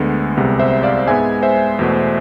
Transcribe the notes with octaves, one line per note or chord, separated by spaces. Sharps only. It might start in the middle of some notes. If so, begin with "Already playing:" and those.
Already playing: D2 D3 G#3 B3
C2 C3 G#3 B3
C5 E5
D5 F5
G#2 G#3 B3 E5 G#5
C5 E5
E2 B2 A3